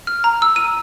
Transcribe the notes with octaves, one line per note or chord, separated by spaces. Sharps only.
F6
A#5
E6
D#7